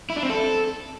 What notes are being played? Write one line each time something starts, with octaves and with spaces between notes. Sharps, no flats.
E4
D4
C4
A4